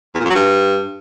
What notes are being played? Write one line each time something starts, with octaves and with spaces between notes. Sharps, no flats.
E2
A#2
F2
F#3
G2